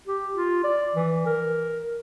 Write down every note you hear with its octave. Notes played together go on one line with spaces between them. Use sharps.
G4
F4
D5
E3
A#4